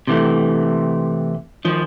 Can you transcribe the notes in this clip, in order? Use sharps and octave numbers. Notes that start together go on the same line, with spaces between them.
C3 E3 A3
D#3 F3